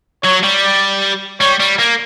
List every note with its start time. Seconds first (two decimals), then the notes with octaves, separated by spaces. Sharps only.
0.24 F#3 C#5
0.44 G3
0.63 D5
1.41 G3 C#5
1.60 G3
1.79 A#3